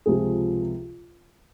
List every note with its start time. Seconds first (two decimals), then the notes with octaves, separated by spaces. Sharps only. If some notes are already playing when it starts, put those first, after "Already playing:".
0.06 C#2 C3 F3 G#4